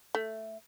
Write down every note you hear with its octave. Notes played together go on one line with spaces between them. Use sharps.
A3